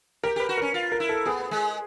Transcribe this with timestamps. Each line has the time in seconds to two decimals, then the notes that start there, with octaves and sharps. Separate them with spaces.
0.23 G4 A#4
0.36 G4 B4
0.49 F#4
0.58 C#4 A#4
0.74 F4
0.92 A#4
1.00 E4
1.09 A4
1.25 B3 G#4
1.51 G#3